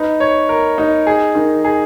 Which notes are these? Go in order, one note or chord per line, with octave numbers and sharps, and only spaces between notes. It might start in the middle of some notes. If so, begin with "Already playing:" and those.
Already playing: D#4 B4
C#5
A#4
D#4
G#4
D#3
G#4